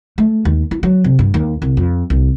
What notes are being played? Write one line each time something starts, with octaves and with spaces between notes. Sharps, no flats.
A3
D#2
E4
F#3
C3
G2
D#2
C2
F2
C2